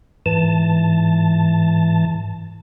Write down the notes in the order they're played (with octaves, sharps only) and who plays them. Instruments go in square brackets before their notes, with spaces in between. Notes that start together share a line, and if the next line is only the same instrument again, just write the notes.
[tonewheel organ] G#2 E3 A5